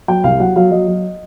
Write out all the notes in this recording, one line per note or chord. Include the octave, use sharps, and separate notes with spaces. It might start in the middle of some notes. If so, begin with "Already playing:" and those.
F#3 G5
C2 F5
F#3 F#5
F#3 F5
F#3 D#5
F#3